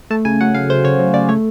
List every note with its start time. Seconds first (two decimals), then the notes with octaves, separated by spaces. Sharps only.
0.10 A3 A5
0.25 C#3 G#5
0.41 F#3 F#5
0.55 C#3 F5
0.70 A3 C5
0.84 C#3 C#5
0.99 F#3
1.14 C#3 D5
1.29 A3 C#5